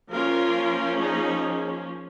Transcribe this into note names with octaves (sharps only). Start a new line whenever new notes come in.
F3 A#3 C#4 F4 A#4
D#4 G#4